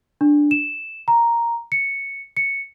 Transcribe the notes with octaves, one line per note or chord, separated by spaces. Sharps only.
D4
E7
A#5
C#7
C#7